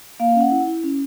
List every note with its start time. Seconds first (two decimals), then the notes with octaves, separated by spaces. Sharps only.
0.20 A#3 F5
0.35 C#4
0.41 F#5
0.51 E4
0.67 E4
0.83 C#4